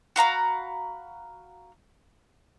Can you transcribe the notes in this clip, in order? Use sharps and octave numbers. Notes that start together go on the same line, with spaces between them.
F#4 F5 A#5 B5